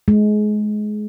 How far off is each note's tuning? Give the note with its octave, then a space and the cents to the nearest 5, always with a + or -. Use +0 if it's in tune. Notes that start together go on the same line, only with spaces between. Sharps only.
G#3 +25